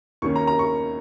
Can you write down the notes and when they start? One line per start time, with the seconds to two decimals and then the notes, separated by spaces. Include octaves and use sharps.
0.22 D#2 D#3 A#3 C#4 C#6
0.36 A#5
0.47 A#5
0.59 C#6